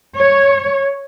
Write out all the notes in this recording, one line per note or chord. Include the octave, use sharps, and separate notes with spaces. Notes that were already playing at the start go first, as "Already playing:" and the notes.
C#5